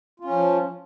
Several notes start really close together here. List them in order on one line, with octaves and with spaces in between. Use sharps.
F4 C#4 F3